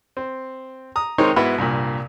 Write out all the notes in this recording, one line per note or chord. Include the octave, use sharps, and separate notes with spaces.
C4
A#5 D#6
D#3 G#3 C4 D#4 A#4 C#5
G#2 B3 E4 F#4
C2 G2 A#2